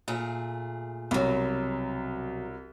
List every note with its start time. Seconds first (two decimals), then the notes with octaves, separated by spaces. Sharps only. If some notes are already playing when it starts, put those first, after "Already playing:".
0.08 A#2 A3 G#4
1.11 C2 B2 F#3